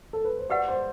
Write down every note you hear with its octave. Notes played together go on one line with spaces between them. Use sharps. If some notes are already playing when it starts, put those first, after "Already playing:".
A4
B4
C5
G4 B4 D5 F#5
C5